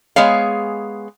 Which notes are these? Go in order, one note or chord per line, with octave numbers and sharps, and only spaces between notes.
G#3 B3 G#4 C#5 F5